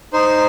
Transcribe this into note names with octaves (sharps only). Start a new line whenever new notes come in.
D#4 C5